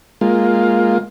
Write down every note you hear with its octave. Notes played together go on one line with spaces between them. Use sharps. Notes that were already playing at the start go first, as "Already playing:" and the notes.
G#3 A#3 F4